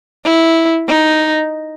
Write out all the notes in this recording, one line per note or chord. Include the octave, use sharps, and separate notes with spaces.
E4
D#4